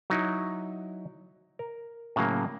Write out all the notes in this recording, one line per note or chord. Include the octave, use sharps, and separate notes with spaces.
F#3 D#4 E4
A#4
A2 C#3 F#3 A#3